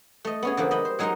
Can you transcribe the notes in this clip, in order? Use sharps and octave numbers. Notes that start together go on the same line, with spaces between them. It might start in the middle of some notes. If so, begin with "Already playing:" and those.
A3 D#5
B3 C#4 G#4
D3 F3 A#3 B4
G3 D#5 B5
C5
F#3 G#3 D#4 A#4 F#5 A#5